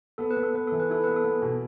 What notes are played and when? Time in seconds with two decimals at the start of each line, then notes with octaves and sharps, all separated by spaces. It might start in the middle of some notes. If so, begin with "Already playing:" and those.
0.18 B3 A4
0.31 B4
0.37 B3
0.43 A4
0.54 B3 B4
0.67 E3 A4
0.80 B4
0.90 E4 A4
1.04 B3 B4
1.16 A4
1.24 B3
1.42 B2